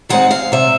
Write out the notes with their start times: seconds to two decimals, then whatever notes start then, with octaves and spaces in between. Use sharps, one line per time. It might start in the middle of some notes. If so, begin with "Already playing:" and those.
0.09 D#3 G#3 C4 D#4 F#5
0.31 F5
0.52 C3 E5